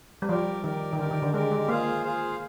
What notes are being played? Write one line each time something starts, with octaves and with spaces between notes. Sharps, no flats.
G3
F3 G4 A#4 D5
D#3 G4 A#4 D5
D#3
D3 G4 A#4 D5
D#3
D3
G#3 G4 A#4 D5
G#3
A#3 F4 G#4 C5 F5
F4 G#4 C5 F5